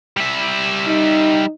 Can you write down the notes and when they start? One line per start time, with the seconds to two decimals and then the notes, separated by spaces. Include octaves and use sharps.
0.17 G3 E5
0.88 D#4